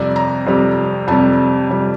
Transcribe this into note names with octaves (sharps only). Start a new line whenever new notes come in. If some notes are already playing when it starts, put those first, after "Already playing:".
Already playing: F2 C3 G3 D5
A#5
F2 C3 G3
F2 C3 G3 A5
F2 C3 G3